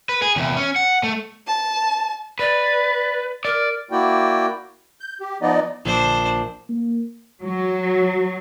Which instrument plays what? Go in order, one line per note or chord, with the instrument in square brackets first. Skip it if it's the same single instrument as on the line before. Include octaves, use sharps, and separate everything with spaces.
[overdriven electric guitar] B4
G#4
E2 C3
C#4
F#5
A3
[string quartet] A5
[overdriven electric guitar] B4 [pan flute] D5
[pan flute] A#4 [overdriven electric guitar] D5
[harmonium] A#3 E4 F#4 D5 G5
[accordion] G6
G4
F3 B3 D#4 D5 D#5
[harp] A#1 [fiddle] D4 C5
[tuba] A#3
[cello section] F#3